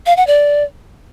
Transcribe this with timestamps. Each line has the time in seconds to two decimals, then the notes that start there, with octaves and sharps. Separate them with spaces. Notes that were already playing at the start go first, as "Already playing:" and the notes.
0.06 F5
0.17 F#5
0.27 D5